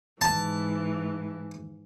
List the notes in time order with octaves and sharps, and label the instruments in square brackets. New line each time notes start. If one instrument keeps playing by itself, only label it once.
[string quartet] G#2 E3 [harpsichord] A5